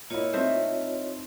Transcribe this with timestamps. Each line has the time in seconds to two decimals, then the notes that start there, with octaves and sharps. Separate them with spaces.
0.10 A#2 E4 F4 C#5 D#5
0.33 A3 C4 D#4 C5 E5